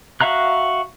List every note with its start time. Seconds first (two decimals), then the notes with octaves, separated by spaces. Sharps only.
0.21 F#4 E5 F5 A#5 F#6